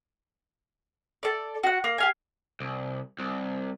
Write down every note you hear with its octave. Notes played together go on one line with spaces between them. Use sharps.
A4 D5
F#4 F#5
A#3
G4 F5 G#5
C2
C2